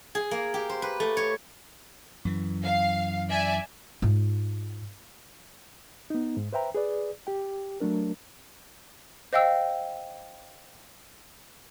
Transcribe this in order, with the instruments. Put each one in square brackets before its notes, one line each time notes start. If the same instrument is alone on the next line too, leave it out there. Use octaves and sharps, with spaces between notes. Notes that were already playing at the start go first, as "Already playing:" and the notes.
[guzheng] G#4
A#3
G4
C5
B4
A3
C#5
[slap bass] F#2 E3
[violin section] F5
D5 E5 G#5
[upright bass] G#2 F4
[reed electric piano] B3 D#4
G#2
B4 C5 E5 G5 A#5
G#4 B4 D5
G4 G5
F#3 A3 D4 A#4
[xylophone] C5 D#5 F5 G5 E6